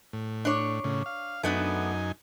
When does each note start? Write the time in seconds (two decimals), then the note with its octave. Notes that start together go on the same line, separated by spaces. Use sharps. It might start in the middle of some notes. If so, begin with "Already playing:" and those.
0.13 A2
0.45 D4 C#5
0.84 A2 C#3
1.06 F5
1.43 F#2 A3 B3 D4 D#4 G#5